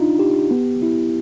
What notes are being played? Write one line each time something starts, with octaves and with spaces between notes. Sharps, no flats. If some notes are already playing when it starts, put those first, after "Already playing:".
Already playing: D4 D#4 F4
G4
B3
E4